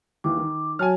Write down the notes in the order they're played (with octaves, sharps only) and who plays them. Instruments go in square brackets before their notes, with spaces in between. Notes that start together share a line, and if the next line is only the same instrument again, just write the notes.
[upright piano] D#2 E3 [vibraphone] D6
[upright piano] D#3
[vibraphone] F#3 F#4 C#5 [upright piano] G#5 A5 F6